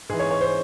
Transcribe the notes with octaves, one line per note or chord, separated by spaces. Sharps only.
G#2 E3 G#4
C#5
C#5
C5